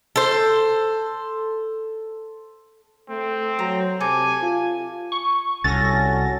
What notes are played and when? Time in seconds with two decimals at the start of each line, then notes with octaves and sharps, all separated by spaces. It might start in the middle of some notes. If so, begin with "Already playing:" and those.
0.16 A4 C5
3.09 A3 C4
3.59 F#3 A#5
4.00 C3 A4 G#5 D6
4.43 F4
5.12 C#6
5.64 C2 C#4 F#4 A4 A6 A#6